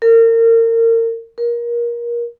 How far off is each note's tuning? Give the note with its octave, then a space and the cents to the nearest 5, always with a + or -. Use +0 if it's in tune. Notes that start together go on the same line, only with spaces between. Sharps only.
A#4 -30
A#4 +25